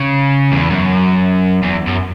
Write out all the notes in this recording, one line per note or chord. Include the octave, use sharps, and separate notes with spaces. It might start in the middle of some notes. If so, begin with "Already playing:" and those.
Already playing: C#3
E2
F#2
E2
F#2